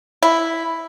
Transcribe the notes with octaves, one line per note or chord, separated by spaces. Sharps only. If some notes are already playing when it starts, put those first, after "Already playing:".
E4